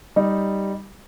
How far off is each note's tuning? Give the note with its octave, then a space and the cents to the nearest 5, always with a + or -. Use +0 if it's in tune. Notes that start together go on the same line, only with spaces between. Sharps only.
G3 +0 D#4 +0 G4 +0